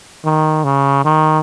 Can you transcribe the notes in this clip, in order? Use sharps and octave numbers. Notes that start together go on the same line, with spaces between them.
D#3
C#3
D#3